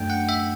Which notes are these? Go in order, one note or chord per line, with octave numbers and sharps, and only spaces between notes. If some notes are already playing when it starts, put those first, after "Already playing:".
Already playing: F#2 F#3 A3 D4 G5
F#5
E5